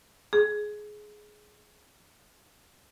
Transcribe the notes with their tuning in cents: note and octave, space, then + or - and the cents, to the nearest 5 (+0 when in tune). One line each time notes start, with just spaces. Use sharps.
G#4 +15